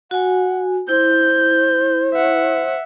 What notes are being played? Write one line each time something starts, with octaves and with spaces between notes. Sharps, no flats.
F#4 F#5 G#5
E4 C5 G6
E5 F#5